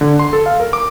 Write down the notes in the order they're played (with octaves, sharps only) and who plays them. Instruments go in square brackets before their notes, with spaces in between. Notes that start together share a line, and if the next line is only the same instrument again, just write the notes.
[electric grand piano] D3
C6
A4
F5
A#4
D6